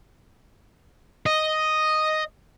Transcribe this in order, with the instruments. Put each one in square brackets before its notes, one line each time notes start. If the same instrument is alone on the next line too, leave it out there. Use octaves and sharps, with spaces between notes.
[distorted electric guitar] D#5